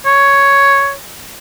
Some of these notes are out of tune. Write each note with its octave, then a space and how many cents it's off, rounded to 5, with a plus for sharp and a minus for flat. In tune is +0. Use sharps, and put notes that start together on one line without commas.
C#5 +5